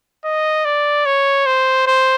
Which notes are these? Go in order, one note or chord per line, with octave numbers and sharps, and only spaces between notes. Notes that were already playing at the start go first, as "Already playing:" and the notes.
D#5
D5
C#5
C5
C5